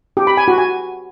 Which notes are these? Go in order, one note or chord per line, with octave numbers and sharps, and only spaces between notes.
G4
B5
G#5
F#4
G#5